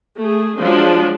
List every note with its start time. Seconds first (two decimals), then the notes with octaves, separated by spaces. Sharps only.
0.17 A3 G#4
0.60 F3 F#3 G#3 D4